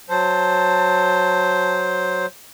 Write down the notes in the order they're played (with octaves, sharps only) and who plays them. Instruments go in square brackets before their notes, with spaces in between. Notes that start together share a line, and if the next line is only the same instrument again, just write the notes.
[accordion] F#3 C5 [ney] A5